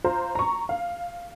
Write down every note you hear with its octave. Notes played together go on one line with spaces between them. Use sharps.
F4 C5 A#5
A#5 C#6
F5